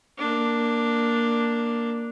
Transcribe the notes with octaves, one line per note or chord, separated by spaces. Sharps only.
A#3 D4